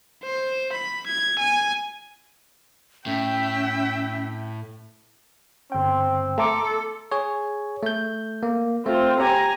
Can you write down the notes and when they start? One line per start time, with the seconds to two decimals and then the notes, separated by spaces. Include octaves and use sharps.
0.23 C5
0.73 B5
1.07 G#6
1.39 G#5
3.06 A2 C#4 E5 G5
5.72 G1 C4 G5
6.38 A3 A4 A#5 C6 D6
7.12 G#4 C#5
7.83 A3 G6
8.43 A#3
8.86 A3 C4 F4
9.21 G4 G#5 A#5